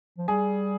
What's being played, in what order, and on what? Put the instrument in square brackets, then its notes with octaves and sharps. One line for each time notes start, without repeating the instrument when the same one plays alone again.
[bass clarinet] F3
[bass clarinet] G3 [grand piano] G#4